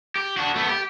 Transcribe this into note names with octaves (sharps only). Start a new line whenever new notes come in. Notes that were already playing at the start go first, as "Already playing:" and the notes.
G4
D4 F#4
A3 B3
G4